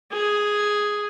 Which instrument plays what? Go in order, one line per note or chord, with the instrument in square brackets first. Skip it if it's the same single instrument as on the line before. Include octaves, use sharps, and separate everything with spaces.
[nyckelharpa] G#4